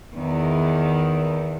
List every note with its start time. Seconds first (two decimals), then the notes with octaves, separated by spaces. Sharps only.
0.15 E2 D#3